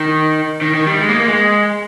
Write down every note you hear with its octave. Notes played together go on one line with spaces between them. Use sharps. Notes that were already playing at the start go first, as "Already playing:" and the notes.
Already playing: D#3
D#3
D#3
G3
G#3
A#3
A#3
G#3